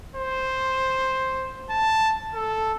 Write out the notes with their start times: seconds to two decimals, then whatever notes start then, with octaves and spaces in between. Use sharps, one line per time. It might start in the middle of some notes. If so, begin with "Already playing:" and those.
0.16 C5
1.70 A5
2.34 A4